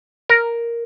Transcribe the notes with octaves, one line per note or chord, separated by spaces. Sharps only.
A#4